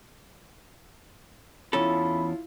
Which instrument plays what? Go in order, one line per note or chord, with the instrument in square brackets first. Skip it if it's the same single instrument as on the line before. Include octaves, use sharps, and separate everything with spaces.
[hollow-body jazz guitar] E2 C#4 A4 [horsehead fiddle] E4 F4 [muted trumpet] B5